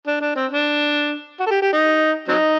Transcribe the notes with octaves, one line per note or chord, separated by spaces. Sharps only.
D4
D4
C4
D4
F#4
A4
G4
G4
D#4
F#3 C4 D#4